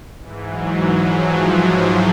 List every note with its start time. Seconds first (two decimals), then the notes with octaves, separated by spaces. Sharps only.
0.20 G#2 E3
0.48 F#3
0.77 F#3
1.06 F3